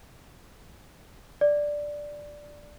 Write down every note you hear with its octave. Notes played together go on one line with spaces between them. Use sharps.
D5